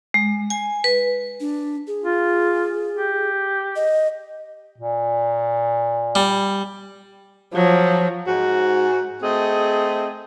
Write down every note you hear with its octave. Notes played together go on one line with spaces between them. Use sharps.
G#3
G#5
B4
D4
G#4
F4
G4
D#5
A#2
G3
F3 F#3
G#2 F#4
A3 C4 G#4 D#5